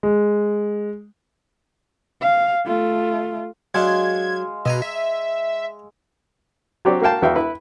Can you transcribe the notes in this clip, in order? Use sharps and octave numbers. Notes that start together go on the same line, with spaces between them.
G#3
F5
A3 F4
F#3 G#3 D4 F5 F#5 G#6
B2 D#5 G#5 A#5 E6
E5
F#3 C4 F#4 G4 D5
A#3 F#4 F5 G5 A5
E2 B3 F#4 E5 F5 G5
E4 B4